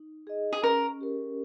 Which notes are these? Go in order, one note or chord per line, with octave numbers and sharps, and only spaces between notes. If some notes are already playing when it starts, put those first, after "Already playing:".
Already playing: D#4
G#4 D#5
G#4
C#4 A#4
G4 A#4